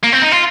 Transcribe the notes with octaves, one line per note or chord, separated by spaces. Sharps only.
A#3
C4
D#4
F4